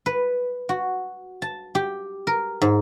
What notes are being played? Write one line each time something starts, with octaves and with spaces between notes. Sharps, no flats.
B4
F#4
A5
G4
A#4
G#2